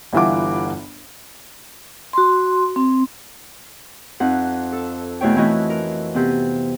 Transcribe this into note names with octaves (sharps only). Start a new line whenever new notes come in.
G1 G2 E3 F4 F#5 D6
F#4 C6
C4
F2 D#4 F#5
A4
E2 B2 A3 E4 C#5 G5
F2 E3 A3 E4 F#4 D#5
A#4
C3 B3